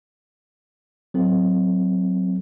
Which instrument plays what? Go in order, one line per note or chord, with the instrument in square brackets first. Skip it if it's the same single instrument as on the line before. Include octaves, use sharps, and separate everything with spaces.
[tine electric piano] F#3 C4 A4